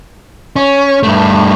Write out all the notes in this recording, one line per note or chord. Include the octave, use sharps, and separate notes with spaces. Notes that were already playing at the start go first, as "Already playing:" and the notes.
C#4
G2 A3